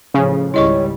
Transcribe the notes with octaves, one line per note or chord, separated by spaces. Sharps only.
A1 C#3 F3
G#1 C#2 G3 E4 C#5 D#5 C#6